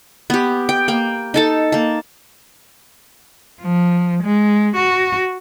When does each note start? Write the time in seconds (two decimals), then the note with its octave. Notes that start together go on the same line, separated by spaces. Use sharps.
0.30 B3 G4
0.69 G5
0.88 A#3 G5
1.34 D#4 A4 A5
1.72 A#3 A5
3.61 F3
4.22 G#3
4.75 F#4